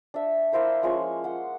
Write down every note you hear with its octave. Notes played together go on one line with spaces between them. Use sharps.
D4 E5
A#3 E4 C5 C6
F3 G#3 C#4 C#6
F#5 C6